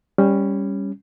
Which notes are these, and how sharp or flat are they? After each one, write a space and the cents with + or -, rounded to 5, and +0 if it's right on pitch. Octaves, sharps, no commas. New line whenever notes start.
G3 +15 C#4 +0